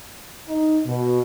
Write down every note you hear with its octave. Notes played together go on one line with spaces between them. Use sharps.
D#4
B2